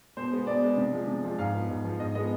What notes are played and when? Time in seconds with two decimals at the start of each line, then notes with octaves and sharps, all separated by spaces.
0.17 B2 C5
0.31 G#3 B3
0.47 B2 D5
0.62 G#3 B3
0.78 C3
0.92 F3 G#3
1.08 C3
1.24 F3 G#3
1.38 G#2 F5
1.54 F3 B3
1.69 G#2
1.84 F3 B3
1.99 G#2 D#5
2.15 F3 G#3 B3 D#5